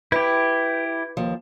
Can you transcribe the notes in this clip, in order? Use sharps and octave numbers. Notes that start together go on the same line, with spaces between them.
E4 G4 B4
D#2 F3